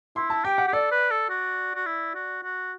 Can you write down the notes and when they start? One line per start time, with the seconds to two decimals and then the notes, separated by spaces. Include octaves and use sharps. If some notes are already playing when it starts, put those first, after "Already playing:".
0.16 E4 C6
0.30 A5
0.45 G4 G5
0.58 F#5
0.68 G4
0.73 A4 D5
0.91 B4
1.11 A4
1.29 F#4
1.75 F#4
1.86 E4
2.15 F#4
2.43 F#4